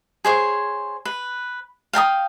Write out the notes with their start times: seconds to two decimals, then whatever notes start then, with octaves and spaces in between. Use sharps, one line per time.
0.25 G#4 C5 C#5
1.05 B4
1.93 F5 G5 A5 D#6